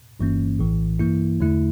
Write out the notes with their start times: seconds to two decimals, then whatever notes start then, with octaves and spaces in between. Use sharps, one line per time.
0.19 G1 G2 E3 A#3 C#4
0.59 A#1 A2 E3
0.99 G2 E3 A#3 E4
1.40 E2 D3 A3 E4